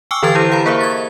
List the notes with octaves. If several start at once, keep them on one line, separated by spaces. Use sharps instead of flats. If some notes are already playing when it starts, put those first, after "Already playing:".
G5 G#5 C#6 D6 E6 F6
D3 E3 A4 B4 G#6 A6
E4 G4 C5
F5 A#5 B5
A#3 G#4 A#4 C5 E5
G#6 A6